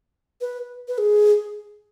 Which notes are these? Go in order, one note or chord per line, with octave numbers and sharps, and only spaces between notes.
B4
B4
G#4